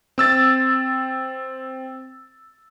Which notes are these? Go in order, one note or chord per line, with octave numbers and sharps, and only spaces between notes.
C4 E6 A6